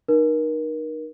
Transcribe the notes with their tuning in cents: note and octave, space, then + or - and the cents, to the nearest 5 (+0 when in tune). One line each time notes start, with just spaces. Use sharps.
D#4 -25 A#4 +30